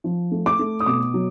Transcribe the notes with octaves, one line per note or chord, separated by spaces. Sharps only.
F3
A3
D6
A3
D#6
B2 D6
F#3